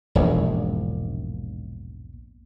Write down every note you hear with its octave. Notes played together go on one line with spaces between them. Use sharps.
E1 A#1 G#2